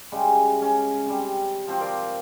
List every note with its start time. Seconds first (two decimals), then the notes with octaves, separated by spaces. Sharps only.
0.12 C#3 G3 G#3
0.62 C#4
1.06 C3 G3
1.68 F3 C4 F#4
1.80 A#4 C5 D5 F5